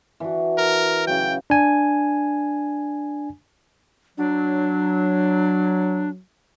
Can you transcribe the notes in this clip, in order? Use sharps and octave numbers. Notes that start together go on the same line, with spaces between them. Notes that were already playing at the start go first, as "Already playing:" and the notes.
E3 D4 F#4
A#4
C#3 F#3 G5
D4 G#5
F#3 D4